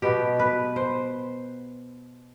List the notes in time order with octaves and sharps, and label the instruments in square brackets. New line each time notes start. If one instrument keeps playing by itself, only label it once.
[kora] B2 B3 G4
B4
C5